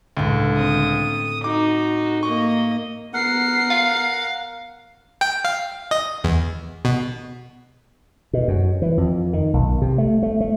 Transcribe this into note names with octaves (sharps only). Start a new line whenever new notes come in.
C#2 A2 D3
C4 D#6
D#4 F#4 D6
A#3 D#5 C#6
B3 A#4 F#5 C7
F5
G5
F5
D#5
E2
B2
B2
F#2
E3
F2
D#3
B1
C3
A3
A3
A3